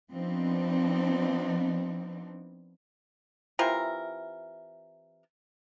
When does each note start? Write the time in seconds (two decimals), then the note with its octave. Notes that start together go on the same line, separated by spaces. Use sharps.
0.11 F3 B3 C4 D4 D#4
3.59 C3 E3 F4 A#4